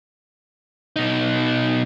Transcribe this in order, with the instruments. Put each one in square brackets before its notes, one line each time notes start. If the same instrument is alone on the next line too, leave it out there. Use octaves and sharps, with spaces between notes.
[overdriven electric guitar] B2 D#4